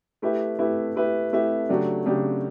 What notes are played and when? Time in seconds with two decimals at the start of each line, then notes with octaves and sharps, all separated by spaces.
0.22 A3 E4 G4 B4 E5
0.59 A3 E4 G4 B4 E5
0.96 A3 E4 G4 B4 E5
1.32 A3 E4 G4 B4 E5
1.69 C#3 F#3 A3 D4 G4
2.06 C#3 F#3 A3 D4 G4